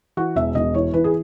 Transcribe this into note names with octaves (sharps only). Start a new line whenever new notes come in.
E3 F#4
E1 E5
E1 D#5
E3 C#5
E3 B4
G#4